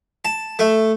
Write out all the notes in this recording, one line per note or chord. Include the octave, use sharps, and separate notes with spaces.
A5
A3